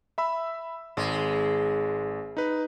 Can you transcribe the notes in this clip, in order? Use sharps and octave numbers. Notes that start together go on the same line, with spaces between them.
E5 B5 E6
G#1 G#3
D#4 B4